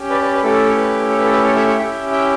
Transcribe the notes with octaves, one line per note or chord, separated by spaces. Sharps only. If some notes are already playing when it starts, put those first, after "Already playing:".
Already playing: C#4 G4
B4 D5
B4 D5
B4
A3 C#4 E4 G4 A4
C#5
B4
C#5
B4
A4
B4
A4 C#5
C#5 E5
C#5 E5
C#4 E4 G4 E5 G5
E5 G5